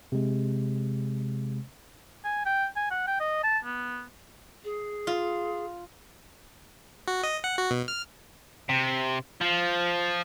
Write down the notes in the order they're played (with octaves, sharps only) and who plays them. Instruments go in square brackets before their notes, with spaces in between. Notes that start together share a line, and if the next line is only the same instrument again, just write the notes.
[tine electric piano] C3 G#3
[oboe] G#5
G5
G#5
F#5
G5
D#5
A5
B3
[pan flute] G#4
[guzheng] F4
[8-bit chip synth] F#4
D#5
F#5
F#4
B2
F6
[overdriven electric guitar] C3
F3